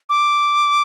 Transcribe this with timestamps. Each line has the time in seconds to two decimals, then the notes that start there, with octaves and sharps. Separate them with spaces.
0.09 D6